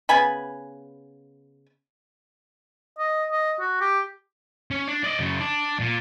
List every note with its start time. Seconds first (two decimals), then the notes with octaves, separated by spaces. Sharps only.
0.09 C#3 B3 G#5 B5
2.98 D#5
3.31 D#5
3.60 F#4
3.81 G4
4.71 C#4
4.88 D4
5.04 D5 D#5
5.19 F#2 C#3
5.40 D4
5.80 A#2